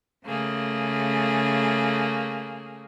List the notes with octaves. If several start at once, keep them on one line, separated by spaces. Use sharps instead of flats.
C#3 A3 A#3 G#4